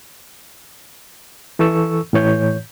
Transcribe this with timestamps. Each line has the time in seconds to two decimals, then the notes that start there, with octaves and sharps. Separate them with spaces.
1.59 E3 A4 C#6 E6
2.13 A2 E3 C#5 G6